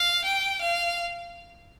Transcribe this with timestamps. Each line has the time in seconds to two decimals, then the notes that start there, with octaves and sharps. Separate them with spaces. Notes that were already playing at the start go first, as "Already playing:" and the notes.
Already playing: F5
0.25 G5
0.62 F5